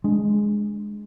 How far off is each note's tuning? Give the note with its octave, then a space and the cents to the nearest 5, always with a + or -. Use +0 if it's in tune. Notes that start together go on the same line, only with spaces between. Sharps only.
G#3 +0 D4 +0